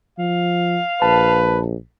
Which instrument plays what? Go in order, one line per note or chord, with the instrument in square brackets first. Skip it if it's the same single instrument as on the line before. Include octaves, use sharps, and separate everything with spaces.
[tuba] F3 [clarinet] F5
[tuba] A#1 [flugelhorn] B4 [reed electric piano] A5